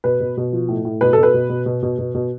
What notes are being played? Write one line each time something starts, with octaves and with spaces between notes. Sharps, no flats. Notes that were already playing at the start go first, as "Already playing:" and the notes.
B2 B4
B2
B2
F3
A2
A2
B2 B4
B2 A4
B4
B2
B2
B2
B2
B2
B2